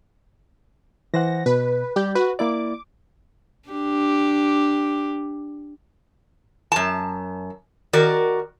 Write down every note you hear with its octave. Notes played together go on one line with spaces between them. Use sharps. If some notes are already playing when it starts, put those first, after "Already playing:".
E3 C5 F#5 A#6
B2 B4
G3 G4 D5 G6
F#4 B4
A#3 E4 D5 D6
D4 G4
F#2 A5
D#3 F#4 A#4 D5